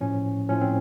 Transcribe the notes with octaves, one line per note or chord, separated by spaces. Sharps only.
A2 F3 C#4
A2 F3 C#4
C4